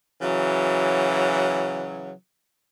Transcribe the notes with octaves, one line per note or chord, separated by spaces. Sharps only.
C#3 E3 F#3